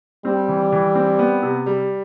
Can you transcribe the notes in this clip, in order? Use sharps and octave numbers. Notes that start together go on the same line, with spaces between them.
G3 C4
E3
E3
C4
B3
C3
G3